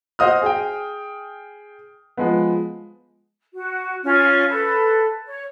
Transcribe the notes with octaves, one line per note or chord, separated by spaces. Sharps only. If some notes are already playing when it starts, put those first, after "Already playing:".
F#4 C5 D#5 D#6 F6
G#4 G5
F3 G#3 B3
F#4
C#4 F4
A4 B4
C#5